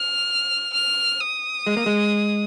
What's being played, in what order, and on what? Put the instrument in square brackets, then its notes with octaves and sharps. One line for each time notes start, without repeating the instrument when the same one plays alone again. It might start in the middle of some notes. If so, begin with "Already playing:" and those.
Already playing: [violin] F6
F6
D#6
[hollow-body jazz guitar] G#3
A#3
G#3